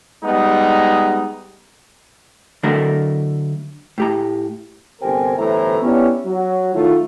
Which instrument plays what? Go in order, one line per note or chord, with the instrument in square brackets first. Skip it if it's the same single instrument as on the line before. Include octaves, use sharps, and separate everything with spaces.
[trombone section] G3 G#3 B3 D#4
[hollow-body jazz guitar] D3 F#3 A3 A#4
A2 G4 A#5
[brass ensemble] G1 C3 A#4 C5 G5 G#5
G1 A2 E3 C5 E5 A#5
B3 C#4 D4 E4 G4 C#5
F#3
D#3 F#3 A3 E4 F4